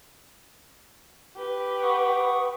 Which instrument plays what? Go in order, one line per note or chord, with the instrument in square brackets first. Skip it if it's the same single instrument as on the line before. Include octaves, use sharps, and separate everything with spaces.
[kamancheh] G4 B4
[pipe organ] F#5 C#6 D#6